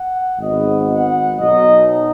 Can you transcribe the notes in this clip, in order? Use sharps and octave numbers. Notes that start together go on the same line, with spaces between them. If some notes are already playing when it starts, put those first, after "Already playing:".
Already playing: F#5
G#1 G#2 D#3 B3 D#5
F#5
B1 B2 F#3 D#4 D#5